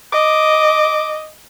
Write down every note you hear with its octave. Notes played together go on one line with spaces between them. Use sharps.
D#5 D6